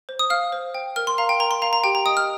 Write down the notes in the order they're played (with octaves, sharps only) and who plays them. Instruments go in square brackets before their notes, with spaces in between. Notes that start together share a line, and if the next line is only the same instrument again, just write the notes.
[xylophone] C5
D#6
F5 F6
C5
G5
A#4 F6
C6
F5 A#5
G5
A#4 A#5
C6
F5 A#5
A#5
G4 G5
A#5
D#5 G5 D#6
F6